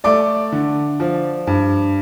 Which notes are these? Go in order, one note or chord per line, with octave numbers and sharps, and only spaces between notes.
A3 D5 D6
D3
F3
G2